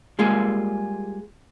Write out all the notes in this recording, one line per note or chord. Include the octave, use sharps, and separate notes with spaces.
G3 G#3 A#3 F4 G#4 F5